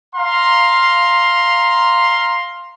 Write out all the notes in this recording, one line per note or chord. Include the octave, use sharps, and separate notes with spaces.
F5 A#5 C6